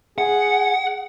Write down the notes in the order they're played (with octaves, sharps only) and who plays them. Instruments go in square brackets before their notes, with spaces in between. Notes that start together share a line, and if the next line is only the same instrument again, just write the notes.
[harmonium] G#4 [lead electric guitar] F#5